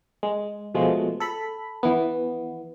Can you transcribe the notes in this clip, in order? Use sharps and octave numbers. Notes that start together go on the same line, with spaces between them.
G#3
B2 F3 G#3 A3
A4 B5
E3 B3